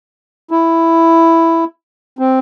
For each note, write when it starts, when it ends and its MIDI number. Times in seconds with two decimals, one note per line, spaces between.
0.51 1.64 64
2.19 2.39 60